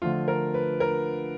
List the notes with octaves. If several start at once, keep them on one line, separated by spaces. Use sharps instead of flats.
D3 F3 A3 F4
A#4
B4
A#4